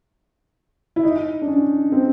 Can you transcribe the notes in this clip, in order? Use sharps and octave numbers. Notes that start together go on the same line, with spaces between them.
E4
D#4
D4
C#4
C4